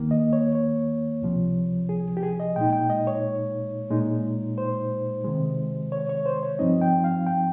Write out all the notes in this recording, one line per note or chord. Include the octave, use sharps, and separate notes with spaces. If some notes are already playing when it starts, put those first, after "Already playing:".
Already playing: D#2 D#3 A#3
D#5
C#5
C#5
C#2 C3 F3
G#4
G4
G#4
D#5
A#2 G#3 D#4 G5
G5
D#5
C#5
A#2 G#3 D#4
C5
C3 D#3 G#3
C#5
C#5
C5
C#5
G2 F3 C4 D#4 D#5
G5
F5
G5